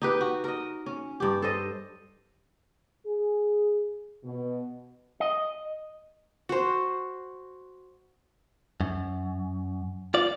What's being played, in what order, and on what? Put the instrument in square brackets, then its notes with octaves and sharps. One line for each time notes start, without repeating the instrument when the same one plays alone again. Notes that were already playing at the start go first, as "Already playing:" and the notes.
[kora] D#4 G4 B4
F#4
A#4 D#5
C#4
G2 G4
A4 C5 D#5
[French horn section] G#4
B2
[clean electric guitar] D#5
[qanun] F#4 C5
[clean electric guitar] F#2
F4 D5